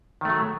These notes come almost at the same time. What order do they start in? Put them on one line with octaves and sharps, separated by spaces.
D#3 A3 F#3